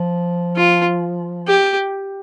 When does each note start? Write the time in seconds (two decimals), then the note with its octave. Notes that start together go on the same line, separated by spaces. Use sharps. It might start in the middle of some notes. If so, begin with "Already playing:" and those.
Already playing: F3
0.56 F4
1.48 G4